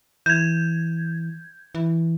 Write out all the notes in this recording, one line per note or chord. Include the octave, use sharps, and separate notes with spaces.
E3 G6 G#6
E3